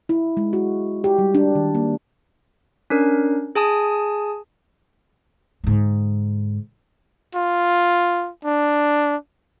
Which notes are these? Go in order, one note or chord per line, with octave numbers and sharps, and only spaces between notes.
E4
G#3
F#4
G4
G3
D4
D#3
A#3
C#4 D4 A#4
G#4 G#5 A5 D#6
G#2 D3
F4
D4